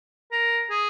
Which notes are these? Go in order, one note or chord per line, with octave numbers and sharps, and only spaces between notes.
A#4
G#4